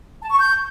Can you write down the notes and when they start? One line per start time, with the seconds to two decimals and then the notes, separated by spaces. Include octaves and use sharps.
0.21 A5
0.30 C#6
0.39 G6